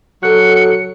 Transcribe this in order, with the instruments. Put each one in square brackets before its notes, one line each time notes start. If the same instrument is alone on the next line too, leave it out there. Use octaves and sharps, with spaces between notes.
[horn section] F#3 [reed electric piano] A4 F#6 [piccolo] C#7